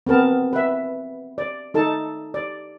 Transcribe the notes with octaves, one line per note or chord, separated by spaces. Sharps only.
B3 C4 A#4 A5
B4 E5
D5
D#4 A4 A5
D5